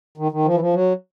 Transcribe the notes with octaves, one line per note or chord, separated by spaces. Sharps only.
D#3
D#3
F3
E3
F3
F#3